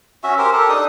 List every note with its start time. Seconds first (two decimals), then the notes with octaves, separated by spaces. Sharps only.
0.24 C#4 F#4 E5
0.38 G4 A#4 C5
0.53 G4 A4 A#4
0.69 D4 D#4 D#6